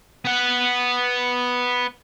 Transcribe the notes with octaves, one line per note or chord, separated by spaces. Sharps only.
B3 F#5